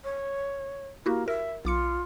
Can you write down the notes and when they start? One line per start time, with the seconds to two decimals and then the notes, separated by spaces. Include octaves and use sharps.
0.04 C#5
1.06 A#3 E4 F#4 G4
1.28 A#4 E5
1.65 B1 F4 D6 C#7